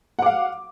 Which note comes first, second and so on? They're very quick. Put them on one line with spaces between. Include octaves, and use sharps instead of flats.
F#5 D6 F5